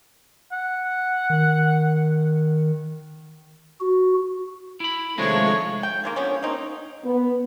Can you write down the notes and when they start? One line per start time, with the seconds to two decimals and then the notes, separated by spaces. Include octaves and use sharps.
0.52 F#5
1.30 D#3
3.81 F#4
4.80 E4 B5
5.18 C3 D#3 F3 G#3 A3 D4 C#5
5.83 G5
6.03 D#3 G#3 A#3
6.16 D3 F3 B3 C#4
6.42 A#3 C4 D#4
7.04 B3